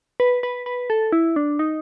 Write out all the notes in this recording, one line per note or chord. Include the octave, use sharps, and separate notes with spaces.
B4
B4
B4
A4
E4
D4
D#4